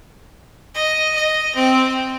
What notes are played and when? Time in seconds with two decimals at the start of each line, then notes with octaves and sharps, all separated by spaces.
0.75 D#5
1.15 D#5
1.55 C4